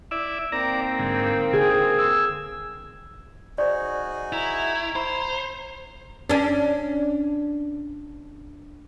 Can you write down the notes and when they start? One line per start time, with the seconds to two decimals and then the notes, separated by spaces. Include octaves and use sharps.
0.11 E4 D5 E5
0.52 A#3 C4 D#4 A#4 D5 A#5
0.99 G#2 D3
1.53 D3 G#4 G#5
1.98 E6
3.58 D#4 F#4 G#4 C5 D5
4.32 E4 A#5
4.96 C5 B5
6.30 C#4 D4